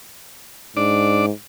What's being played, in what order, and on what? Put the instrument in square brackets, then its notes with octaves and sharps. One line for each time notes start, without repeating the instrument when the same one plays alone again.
[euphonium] G#2 [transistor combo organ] D4 D5